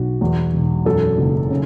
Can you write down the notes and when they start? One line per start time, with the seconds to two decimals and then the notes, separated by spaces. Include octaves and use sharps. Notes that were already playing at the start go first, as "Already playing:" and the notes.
Already playing: B1 B2 F#4
0.21 E2
0.53 E1
0.86 F#2 A4
1.18 F#1
1.50 C#3